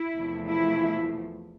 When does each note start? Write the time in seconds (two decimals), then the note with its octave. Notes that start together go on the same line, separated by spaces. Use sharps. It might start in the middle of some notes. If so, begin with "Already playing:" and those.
Already playing: E4
0.16 E2 C3 F3 A3
0.46 E4